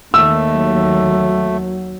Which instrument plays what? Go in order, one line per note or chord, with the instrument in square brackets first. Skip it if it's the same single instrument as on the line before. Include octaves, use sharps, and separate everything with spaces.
[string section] D#2 [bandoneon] A3 [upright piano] E6
[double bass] F#3